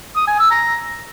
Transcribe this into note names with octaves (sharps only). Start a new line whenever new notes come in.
D#6
G#5
E6
A#5